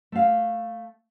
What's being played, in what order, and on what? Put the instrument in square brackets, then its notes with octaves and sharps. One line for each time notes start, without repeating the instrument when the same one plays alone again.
[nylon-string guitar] A3 F5